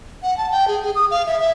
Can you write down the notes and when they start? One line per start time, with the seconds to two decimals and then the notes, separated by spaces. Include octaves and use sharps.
0.23 F#5
0.38 A5
0.51 G5
0.68 G#4
0.83 G#4
0.95 D#6
1.11 F5
1.26 E5
1.40 E5